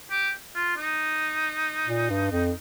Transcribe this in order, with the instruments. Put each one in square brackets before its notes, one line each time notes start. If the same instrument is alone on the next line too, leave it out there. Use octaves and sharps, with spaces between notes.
[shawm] G4
F4
D#4
[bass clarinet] A#2
G2
F2